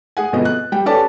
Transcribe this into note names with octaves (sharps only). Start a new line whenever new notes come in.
G#4 F#5 G#5
G1 F2 B2 G#3 D#5
F#6
G3 G5
C#4 G4 A4 B4 D5 A5